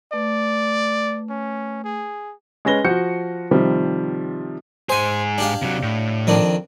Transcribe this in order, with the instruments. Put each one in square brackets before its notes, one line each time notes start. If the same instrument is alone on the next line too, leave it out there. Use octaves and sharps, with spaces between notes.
[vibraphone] A3 B4 [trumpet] D5
[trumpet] C#4
G#4
[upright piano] G#3 C#4 B4 A#6 G7
F3 F#4 G6 C#7
C3 D#3 F3 G3
[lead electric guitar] G#2 G#4 [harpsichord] C5 G#5
[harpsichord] D4 G4 F5
[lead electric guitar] C3 F#3
A2
[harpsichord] F2 D#3 D4